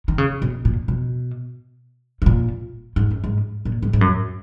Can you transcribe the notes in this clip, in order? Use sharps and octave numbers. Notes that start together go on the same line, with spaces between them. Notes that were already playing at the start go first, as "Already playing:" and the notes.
D#3
C#3
B2
A#2
B2
G#2
A#2
G#2
F#2
G#2
A#2
G#2
G#2
F#2